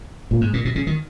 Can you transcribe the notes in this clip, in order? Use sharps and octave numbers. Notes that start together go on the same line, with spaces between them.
A#2
G#2
A#2
B2
C#3
D#3